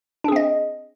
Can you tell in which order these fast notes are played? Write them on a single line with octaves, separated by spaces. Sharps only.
D4 G#4 C4 D#5